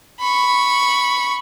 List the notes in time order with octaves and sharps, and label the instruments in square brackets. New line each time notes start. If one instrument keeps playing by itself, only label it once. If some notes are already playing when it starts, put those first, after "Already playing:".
[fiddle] B5 C#6